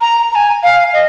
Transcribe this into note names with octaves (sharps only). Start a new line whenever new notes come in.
A#5
A#5
G#5
F5
D#5